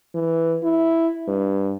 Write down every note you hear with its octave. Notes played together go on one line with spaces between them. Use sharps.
E3
E4
G2